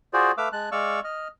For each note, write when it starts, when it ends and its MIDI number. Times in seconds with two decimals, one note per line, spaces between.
0.13 0.32 65
0.13 0.32 66
0.13 0.32 68
0.13 0.32 72
0.13 0.32 74
0.38 0.49 57
0.38 0.49 71
0.38 0.49 77
0.38 0.49 86
0.38 0.49 88
0.53 0.69 56
0.53 0.69 81
0.53 0.69 90
0.72 1.00 56
0.72 1.00 74
0.72 1.00 77
0.72 1.00 85
0.72 1.00 88
1.04 1.28 75
1.04 1.28 89